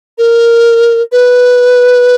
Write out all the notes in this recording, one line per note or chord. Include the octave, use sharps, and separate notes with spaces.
A#4
B4